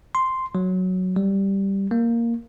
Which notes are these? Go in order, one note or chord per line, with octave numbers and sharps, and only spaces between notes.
C6
F#3
G3
A#3